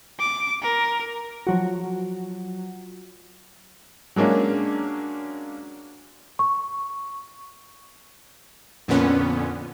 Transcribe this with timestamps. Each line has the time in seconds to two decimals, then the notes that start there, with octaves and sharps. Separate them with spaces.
0.19 D6
0.63 A#4
1.47 F3 F#3 F#4
4.16 F#3 G#3 A#3 C#4 D4
6.39 C#6
8.88 F2 A#2 D3 B3 C#4